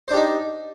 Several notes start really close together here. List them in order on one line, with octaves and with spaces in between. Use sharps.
C5 D4 G4 D#4